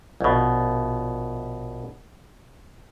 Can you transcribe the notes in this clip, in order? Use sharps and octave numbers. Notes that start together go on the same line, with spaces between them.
A#1 B2